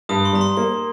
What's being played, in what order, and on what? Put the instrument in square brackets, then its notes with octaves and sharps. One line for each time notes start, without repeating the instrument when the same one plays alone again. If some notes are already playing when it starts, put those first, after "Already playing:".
[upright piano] G2 [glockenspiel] D#6
[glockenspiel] C6
[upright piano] G3 [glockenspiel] A#5
[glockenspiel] C6
[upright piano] A#3 [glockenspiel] C6